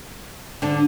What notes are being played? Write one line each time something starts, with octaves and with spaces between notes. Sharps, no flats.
D3 D4